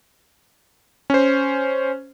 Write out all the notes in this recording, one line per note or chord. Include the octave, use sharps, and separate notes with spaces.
C#4 C5